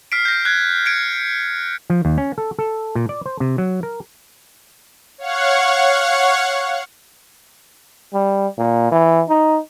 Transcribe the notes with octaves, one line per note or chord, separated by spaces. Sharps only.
F6 B6 C7 D7
G6 A#6
F#6 G#6
G#6 C#7 D7
F3
D#2
C#4
A4
A4
A#2
D5
C5
C3
F#3
A#4
C#5 F5 F#5 C#6
G3
A#2
E3
D#4